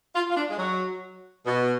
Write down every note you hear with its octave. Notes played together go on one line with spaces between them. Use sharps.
F4
F4
D4
G#3
F#3
B2